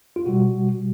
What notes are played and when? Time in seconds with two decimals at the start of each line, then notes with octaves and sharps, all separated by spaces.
0.16 F4
0.26 B2 G3 F#4